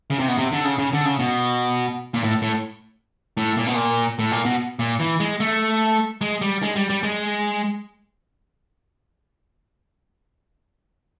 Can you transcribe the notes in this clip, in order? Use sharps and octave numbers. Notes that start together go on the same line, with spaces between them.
C#3
C3
B2
C3
D3
C#3
C#3
D3
C#3
B2
A#2
A2
A2
A2
A#2
B2
A#2
A2
A#2
B2
A#2
E3
G#3
A3
G#3
G3
G#3
G3
G3
G#3